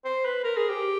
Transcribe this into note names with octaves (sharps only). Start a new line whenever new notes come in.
C5
B4
A#4
G#4
G4